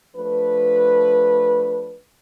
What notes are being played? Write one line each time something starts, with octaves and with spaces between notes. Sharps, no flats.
F3 A3 D4 B4